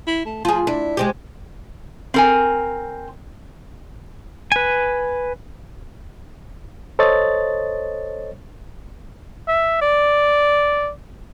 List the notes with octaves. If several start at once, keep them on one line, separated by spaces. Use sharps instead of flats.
E4
A3
F3 F4 G#4
D4 E4
G#3 C4 G4
C4 A#4 G#5
B4 G#5
A4 C5 C#5 D#5 A6
E5
D5